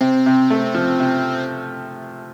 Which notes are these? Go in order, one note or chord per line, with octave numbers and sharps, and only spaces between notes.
C3 C4
C3
A3
F3
C3